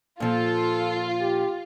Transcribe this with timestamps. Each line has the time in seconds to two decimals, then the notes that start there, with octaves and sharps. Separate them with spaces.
0.20 A#2 F3 F4 A4
1.21 G4